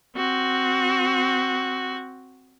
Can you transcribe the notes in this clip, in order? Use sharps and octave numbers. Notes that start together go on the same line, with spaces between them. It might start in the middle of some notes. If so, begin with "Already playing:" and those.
C4 F#4